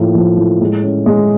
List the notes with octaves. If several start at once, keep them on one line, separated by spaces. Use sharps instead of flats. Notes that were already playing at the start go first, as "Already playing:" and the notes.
Already playing: A2 F3 A#3
F3
A2
G#3
C#4
G#3